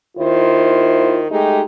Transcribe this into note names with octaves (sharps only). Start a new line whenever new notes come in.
D#2 D#3 E4 F4 C5
G#3 A3 D#4 G4